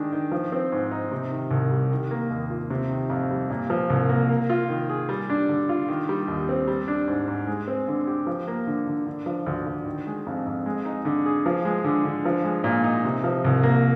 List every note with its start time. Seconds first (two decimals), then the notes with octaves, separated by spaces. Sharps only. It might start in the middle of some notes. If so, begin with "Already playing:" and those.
Already playing: D#3 G#3 D4
0.13 D#3
0.32 F3
0.52 C4
0.72 G#2
0.91 D#4
1.11 C3
1.31 D#3
1.51 C2
1.71 G3
1.92 D#3
2.11 A#3
2.30 D#2
2.50 F4
2.70 C3
2.90 D#3
3.10 F2
3.31 G3
3.50 A#2
3.70 F3
3.90 C2
4.09 A#3
4.29 A#3
4.50 F4
4.69 D#3
4.89 G#4
5.09 G3
5.30 D4
5.49 D3
5.69 F4
5.88 D#3
6.09 G3
6.28 D#2
6.49 C4
6.67 G3
6.88 D4
7.08 G#2
7.28 G#2
7.47 G#3
7.68 C4
7.88 D3
8.07 G4
8.27 F3
8.47 A#3
8.67 D3
8.87 D3
9.07 D3
9.26 F3
9.46 D2
9.66 D2
9.86 D#3
10.07 G#3
10.27 F2
10.46 F2
10.66 G#3
10.85 D#4
11.05 D3
11.26 G#4
11.46 F3
11.65 G#3
11.84 D3
12.05 D3
12.25 F3
12.44 G#3
12.64 A#2
12.84 D#4
13.04 C3
13.24 F3
13.45 C2
13.63 A#3